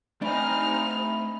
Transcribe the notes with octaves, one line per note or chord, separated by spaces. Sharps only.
A3 C4 D4 D#4 G#5 B5 F6